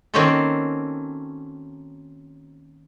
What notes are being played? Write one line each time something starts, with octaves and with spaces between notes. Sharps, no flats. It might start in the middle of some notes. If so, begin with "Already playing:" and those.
D#3 A#3 C4 C#4 F#4 A4